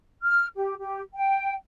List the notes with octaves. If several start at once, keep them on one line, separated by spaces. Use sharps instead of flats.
F6
G4
G4
G5